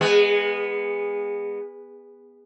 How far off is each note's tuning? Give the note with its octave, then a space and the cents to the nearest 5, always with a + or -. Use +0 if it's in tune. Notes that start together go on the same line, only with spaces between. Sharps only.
G#3 -25 B3 +0